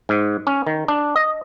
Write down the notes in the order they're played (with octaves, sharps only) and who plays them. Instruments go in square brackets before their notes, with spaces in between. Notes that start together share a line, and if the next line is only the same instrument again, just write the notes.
[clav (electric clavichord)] G#2
C#4
D#3
D4
D#5